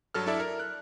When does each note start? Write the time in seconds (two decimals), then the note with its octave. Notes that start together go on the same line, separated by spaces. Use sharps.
0.14 G2 F#3 A4 F6
0.26 D4 E4 A4 D5 E5
0.40 A#4
0.60 F#6